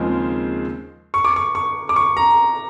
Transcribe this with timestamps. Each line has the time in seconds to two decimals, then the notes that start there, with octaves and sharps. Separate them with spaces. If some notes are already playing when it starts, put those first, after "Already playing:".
Already playing: D#2 C#3 F3 G#3 C4
1.14 C#6
1.25 D6
1.36 C#6
1.55 C#6
1.89 D6
1.96 C#6
2.17 A#5